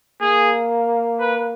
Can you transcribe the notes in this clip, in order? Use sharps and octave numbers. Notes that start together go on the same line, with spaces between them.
A#3 G#4
B4